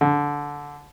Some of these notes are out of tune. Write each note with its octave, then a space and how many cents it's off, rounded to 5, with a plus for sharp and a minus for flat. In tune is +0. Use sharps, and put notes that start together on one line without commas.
D3 -15